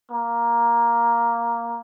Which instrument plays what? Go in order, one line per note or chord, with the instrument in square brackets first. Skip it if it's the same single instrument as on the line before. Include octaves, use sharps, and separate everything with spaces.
[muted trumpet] A#3